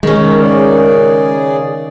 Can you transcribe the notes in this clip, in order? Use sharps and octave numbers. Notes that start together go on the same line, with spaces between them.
D#3 G#3 C#4
C#3 G#4 A#4 C#5 D5